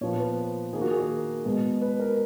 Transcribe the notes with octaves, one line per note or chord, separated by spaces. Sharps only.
A#2 F3 B3 C#5
B4
D#3 A#3 G#4
F#4
G#4
A#4
B2 G#3 B3
B4
A#4